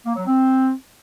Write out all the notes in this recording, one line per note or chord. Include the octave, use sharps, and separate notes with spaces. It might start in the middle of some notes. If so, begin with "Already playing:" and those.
A#3
F#3
C4